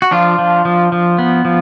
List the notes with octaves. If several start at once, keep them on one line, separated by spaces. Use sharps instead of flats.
F#4
F3 D4 F4
F3
F3
F3
B3
F3